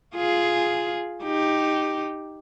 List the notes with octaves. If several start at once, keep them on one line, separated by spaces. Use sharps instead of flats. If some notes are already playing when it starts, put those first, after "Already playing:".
F4 G#4
D#4 G4